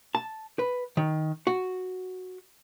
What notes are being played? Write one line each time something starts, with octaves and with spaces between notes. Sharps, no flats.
A5
B4
D#3
F#4